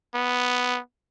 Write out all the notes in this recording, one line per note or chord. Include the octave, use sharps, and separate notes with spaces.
B3